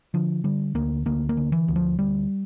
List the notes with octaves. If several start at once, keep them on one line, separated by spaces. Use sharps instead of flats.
D3 F3
D3 G3
D2 A#3
D2 A#3
A#3
D3
E3
D2
F3
D2 G3